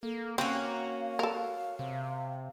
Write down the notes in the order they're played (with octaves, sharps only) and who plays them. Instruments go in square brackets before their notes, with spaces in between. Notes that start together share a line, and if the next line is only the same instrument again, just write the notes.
[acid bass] A#3 [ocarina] A4
[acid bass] A#3 [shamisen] C4 [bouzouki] C#4 F#4 [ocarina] F5
[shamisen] A4 A#4
[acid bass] C3